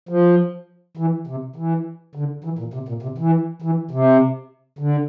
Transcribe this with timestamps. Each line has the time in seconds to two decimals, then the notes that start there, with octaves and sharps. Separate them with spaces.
0.09 F3
0.97 E3
1.27 C3
1.56 E3
2.15 D3
2.44 E3
2.59 A#2
2.74 C3
2.89 A#2
3.03 C3
3.18 E3
3.62 E3
3.91 C3
4.79 D3